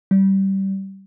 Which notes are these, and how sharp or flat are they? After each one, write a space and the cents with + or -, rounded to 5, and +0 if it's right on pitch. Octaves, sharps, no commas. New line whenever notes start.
G3 -20